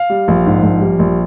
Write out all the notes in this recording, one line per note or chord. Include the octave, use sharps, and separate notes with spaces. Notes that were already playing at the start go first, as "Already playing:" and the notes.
Already playing: F5
G3
A#1
G#2
A#1
G3
A#1